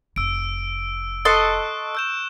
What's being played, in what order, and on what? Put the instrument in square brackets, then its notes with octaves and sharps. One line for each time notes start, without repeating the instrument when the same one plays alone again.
[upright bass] F1 [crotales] E6 D7
[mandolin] A4 D#5 C6 [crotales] C#6 E6 F#6
[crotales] E6 G6 E7